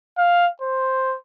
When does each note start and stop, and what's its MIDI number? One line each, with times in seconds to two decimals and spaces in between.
0.18 0.48 77
0.62 1.16 72